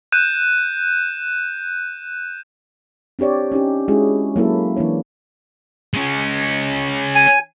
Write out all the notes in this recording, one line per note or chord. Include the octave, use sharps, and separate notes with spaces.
F#6 G6 D#7 E7
C4 D4 G4 C#5 D5
C#4 D#4 G4
G#3 C#4 D4 E4 F#4 G#4
F#3 A#3 E4 A4
E3 A#3 D4 C#5
G#3 C#4
G#5